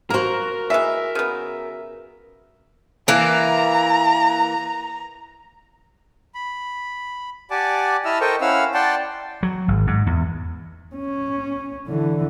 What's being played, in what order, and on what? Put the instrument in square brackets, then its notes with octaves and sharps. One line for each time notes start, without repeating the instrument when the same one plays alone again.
[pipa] A#3 C5 [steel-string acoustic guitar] F#4 A#5 [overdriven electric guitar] A#4
[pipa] E3 G#3 [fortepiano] E5
[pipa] C#3 B3
[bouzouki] E3 A#3 [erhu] A#5
[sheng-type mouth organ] B5
G4 D5 F#5 G#5 A5 D6
E4 D#5 E5 A5 E6 F6
A4 A#4 C5 D#5 G5 C#6
C#4 E4 F5 F#5 E6 F6
D5 F#5 G5 A5 C6
[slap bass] F#3
G#1
G#2
E2
[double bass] C#4
D3 E3